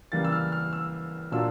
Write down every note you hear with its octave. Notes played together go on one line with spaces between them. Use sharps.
C#3 E3 G3 A#3 A6
E6
F6
F6
E6
A#2 F#3 A#3 D4 F4 E6